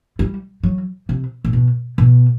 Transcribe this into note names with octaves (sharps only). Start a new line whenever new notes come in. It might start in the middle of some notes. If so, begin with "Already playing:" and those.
G3
F#3
C3
A2
B2
B2